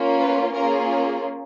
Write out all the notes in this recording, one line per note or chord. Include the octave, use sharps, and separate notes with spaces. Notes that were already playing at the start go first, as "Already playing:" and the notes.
Already playing: A#3 C#4 F4
B4
A#3 C#4 F4 G#4 A#4